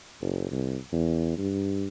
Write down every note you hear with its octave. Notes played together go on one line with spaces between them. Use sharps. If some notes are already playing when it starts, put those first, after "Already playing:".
F#1
C2
E2
G2